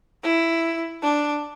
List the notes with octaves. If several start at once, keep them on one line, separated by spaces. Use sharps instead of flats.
E4
D4